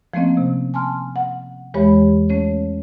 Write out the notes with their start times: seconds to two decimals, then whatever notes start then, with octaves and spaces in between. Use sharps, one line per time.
0.14 F3 A3 A#3 C4 C#4 D#5
0.37 C3
0.74 G#5 A5 C6 F6
1.16 F#5
1.74 E2 E3 G#3 G4 C#5 B5
2.29 A3 C#4 C#5